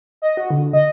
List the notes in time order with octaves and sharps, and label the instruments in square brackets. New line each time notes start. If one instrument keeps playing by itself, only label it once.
[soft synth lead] D#5
F#4
D3
D#5